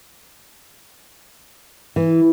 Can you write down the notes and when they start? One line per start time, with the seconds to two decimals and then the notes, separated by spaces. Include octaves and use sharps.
1.96 E3